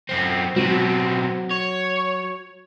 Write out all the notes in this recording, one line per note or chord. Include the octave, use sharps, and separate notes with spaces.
F#2 C4
B2 F#3 C4 D#7
C#5